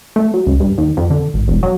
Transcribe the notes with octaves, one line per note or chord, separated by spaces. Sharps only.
A3
F#3
C#2
G2
D#2
F2
D3
G#1
E1
F#3